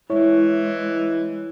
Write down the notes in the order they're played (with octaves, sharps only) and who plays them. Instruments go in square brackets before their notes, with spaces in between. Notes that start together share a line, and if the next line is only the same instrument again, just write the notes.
[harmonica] E3 [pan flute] G#3 [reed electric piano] E4 C#5